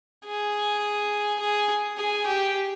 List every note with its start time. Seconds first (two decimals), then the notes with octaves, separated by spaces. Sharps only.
0.25 G#4
1.40 G#4
1.98 G#4
2.26 G4